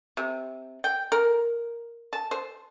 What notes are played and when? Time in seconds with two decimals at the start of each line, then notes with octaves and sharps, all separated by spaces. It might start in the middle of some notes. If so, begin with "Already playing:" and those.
0.17 C3
0.84 G5
1.12 A#4
2.13 A5
2.31 C5